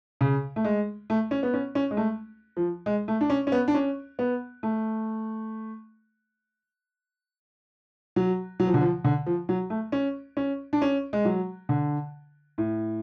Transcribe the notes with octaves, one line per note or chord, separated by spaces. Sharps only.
C#3
A3
G#3
A3
C#4
B3
C#4
C#4
G#3
A3
F3
G#3
A3
D4
C#4
C#4
B3
D4
C#4
B3
A3
F#3
F#3
F3
D3
F3
D3
F3
F#3
A3
C#4
C#4
D4
C#4
G#3
F#3
D3
A2